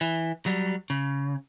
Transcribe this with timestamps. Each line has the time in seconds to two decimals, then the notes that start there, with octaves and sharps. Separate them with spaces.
0.01 E3
0.46 F#3 G3
0.90 C#3